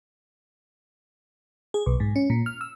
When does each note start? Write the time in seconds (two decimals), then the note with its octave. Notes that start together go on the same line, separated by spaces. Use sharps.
1.74 G#4
1.86 B1
2.00 G#2
2.16 C#4
2.30 A#2
2.46 F6
2.61 E6